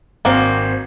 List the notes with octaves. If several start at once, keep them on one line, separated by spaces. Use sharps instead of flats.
G#1 A#3 C4 D4 F#4